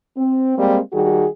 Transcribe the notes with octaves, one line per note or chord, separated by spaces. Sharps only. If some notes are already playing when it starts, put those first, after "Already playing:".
C4
G3 G#3 A#3 C4
D#3 G3 F#4 G#4